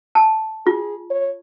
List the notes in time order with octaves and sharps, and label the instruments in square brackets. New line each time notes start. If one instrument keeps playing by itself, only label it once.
[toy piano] A5
[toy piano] F4 [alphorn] G#4
[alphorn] C#5